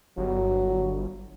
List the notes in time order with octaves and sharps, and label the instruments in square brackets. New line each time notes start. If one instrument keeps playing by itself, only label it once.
[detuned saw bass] G1 [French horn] F#3